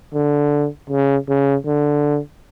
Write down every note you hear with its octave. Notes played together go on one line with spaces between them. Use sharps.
D3
C#3
C#3
D3